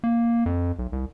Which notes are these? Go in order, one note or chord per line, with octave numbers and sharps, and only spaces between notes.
A#3
F2
B1
C2